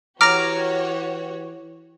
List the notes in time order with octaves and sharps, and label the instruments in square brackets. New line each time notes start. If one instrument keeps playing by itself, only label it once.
[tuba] E3 [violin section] F#4 G4 C#5 [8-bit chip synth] A#5 D6 [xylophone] F6 A#6